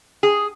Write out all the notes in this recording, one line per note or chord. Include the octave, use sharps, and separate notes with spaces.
G#4